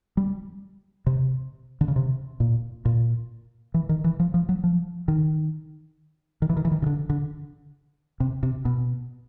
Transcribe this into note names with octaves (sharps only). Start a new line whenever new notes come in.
G3
C3
D3
C#3
C3
A#2
A#2
E3
D#3
E3
F3
F3
F#3
F3
D#3
D#3
E3
D#3
E3
D#3
C#3
D3
D3
C3
C3
B2